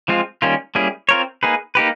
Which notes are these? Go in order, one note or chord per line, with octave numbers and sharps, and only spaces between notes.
F3 G#3 C4 F4
D#3 G3 A#3 C#4 F4
G3 A#3 C#4 E4 G#4
C4 F4 A#4 C#5
A#3 D#4 G#4 B4
A#3 D#4 G4 B4